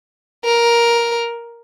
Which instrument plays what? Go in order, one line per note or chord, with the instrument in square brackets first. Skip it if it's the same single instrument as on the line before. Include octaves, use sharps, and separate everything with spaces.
[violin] A#4